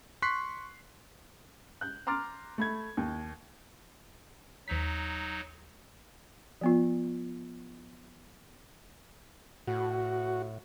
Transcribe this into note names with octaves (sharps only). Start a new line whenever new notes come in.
C6 C#6 F#6 B6 C7
F#6 G6
A#5 C6 D6 F6 A6
A3 B5 G#6
D#2
D#2 F#3 D#4 B6
F3 B3 F4
A2 F#4